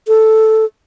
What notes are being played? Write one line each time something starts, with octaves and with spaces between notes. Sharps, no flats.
A4